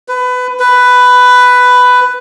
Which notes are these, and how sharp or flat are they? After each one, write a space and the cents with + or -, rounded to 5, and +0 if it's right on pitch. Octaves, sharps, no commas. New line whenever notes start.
B4 +20
B4 +10